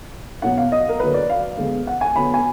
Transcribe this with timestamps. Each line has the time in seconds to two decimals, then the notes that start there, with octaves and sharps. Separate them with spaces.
0.42 B2 F#3 B3 F#5
0.57 F5
0.72 D#5
0.89 A#4
1.00 D3 F#3 A#3 B4
1.14 D5
1.30 F5
1.57 D3 G#3 B3
1.87 F#5
2.01 G#5
2.16 D3 F#3 B3 B5
2.34 G#5